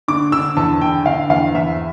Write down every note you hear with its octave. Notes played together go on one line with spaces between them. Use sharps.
D3 D6
D3 E6
E2 A5
D3 G5
D3 F5
E2 F5
E2 E5